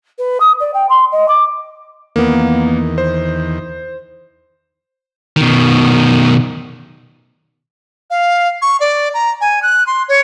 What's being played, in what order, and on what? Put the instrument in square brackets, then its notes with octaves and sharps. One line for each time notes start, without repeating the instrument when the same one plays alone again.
[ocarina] B4
D#6
D5
G5
C6
D#5
D6
[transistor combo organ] E2 D#3 [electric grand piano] A#3 B3
[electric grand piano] C5
[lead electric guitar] B2 D#3
[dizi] F5
C#6
D5
A#5
G#5
F#6
C6
C#5